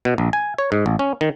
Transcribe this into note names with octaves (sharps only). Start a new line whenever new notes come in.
B2
A#1
G#5
C#5
G#2
A1
C#4
D#3